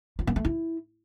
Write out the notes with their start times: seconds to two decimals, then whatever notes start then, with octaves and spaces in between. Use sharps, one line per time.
0.19 F4
0.27 A#3
0.36 A3
0.45 E4